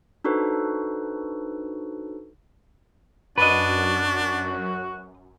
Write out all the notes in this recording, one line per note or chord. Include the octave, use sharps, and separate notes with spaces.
D4 D#4 F#4 A4 B4 C5
F#2 D4 F#4 B4 D#5